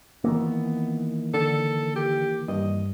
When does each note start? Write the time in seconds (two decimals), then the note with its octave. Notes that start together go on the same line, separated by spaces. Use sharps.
0.24 D#3 E3 A#3 B3
1.34 D3 A4
1.96 G4
2.48 G2 D#5